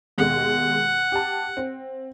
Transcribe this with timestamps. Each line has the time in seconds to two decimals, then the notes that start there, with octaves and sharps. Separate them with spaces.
0.18 D#2 B2 G#3 F#5
1.12 G4 A5
1.57 C4